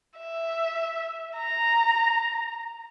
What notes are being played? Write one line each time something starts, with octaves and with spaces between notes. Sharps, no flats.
E5
A#5